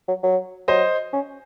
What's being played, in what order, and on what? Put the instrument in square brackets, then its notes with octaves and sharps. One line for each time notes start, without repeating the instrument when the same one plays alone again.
[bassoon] F#3
F#3
[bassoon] F#3 [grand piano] C5 D#5
[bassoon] C#4